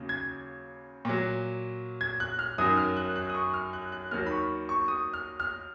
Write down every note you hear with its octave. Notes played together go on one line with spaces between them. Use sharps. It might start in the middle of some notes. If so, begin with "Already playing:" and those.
Already playing: D#2 C#3 F#3
G#6
A#2 F#3
G#6
F#6
F6
F#2 D#3 F#3 D#6
F6
F#6
F#6
D#6
C#6
F6
F#6
F#6
D#2 D#3 F#3 F6
B5
C#6
C#6
D#6
F6
F6